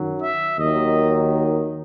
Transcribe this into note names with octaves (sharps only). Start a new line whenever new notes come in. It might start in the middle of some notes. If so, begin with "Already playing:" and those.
Already playing: F#2 D#3 F#3
E5
D#2 D#3 F#3 D#5